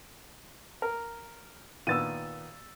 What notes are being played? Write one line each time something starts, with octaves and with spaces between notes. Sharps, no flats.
A#4
A#2 D#3 B3 E6 A6 D#7